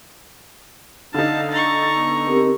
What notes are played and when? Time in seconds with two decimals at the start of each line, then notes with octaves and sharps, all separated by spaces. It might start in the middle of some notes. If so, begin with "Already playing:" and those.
1.14 D3 D#4 F5 A5
1.52 A#5 C#6 A6
1.95 B3
2.27 C4 G4 A#4